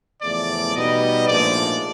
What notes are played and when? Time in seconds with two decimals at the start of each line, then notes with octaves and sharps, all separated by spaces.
0.22 E2 C#3 F3 A3 D5
0.75 B2 G3 B3 D#4 D#5
1.28 A#1 G#2 F3 A3 D5